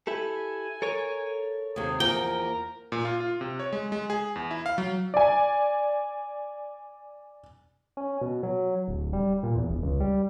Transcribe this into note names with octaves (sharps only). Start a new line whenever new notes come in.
E4 G4 A4 G#5
A4 A#4 C#5
D#2 C3 G#4
E2 F3 A#3 A#4 G5
A#2
F4
F4
C3
C#5
G#3
G#3
G#4
E2
E4
F5
F#3
D5 G#5
C#4
B2
F#3
D1
G3
A#2
E2
E1
C#2
G3